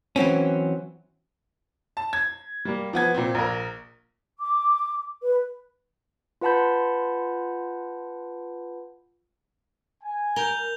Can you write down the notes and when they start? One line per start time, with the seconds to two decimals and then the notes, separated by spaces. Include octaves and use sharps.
0.16 E3 F#3 C4 C#4
1.97 A5
2.13 G#6
2.65 G3 A#3
2.93 F3 B3 G#6
3.14 A#2 C4
3.35 A#1 A#4
4.38 D6
5.22 B4
6.41 F4 B4 F#5 A5 B5 G6
10.03 G#5
10.36 A#4 G6 F7 G7